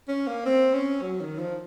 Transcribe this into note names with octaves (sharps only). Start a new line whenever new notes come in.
C#4
A#3
C4
C#4
F#3
D#3
F3